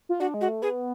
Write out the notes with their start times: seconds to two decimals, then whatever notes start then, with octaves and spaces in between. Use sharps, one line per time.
0.09 F4
0.20 D4 F#4
0.34 G#3
0.41 F#4
0.48 A3
0.62 B3 G#4